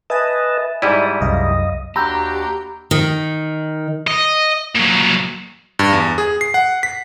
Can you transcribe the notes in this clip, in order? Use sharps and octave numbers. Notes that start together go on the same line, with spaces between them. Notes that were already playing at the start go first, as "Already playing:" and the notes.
B4 D#5 E5 G#5 A5
G#2 G3 E4 D5 D#6
C2 F#2 D#5 F5
D#2 D4 F#4 G4 A#5 B5 E6 G6
D#3
D#5
A#2 F#3
G2
E2
G#4
C7
F#5
B6